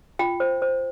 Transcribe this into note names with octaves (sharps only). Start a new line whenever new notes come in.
F4 G5
C5
C5